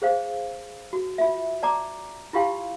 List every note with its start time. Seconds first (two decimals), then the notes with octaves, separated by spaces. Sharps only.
0.02 G#4 C5 F5
0.93 F#4
1.18 F4 E5
1.63 D5 A5 A#5 D6
2.33 E4 F4 G4 F5 G5 C6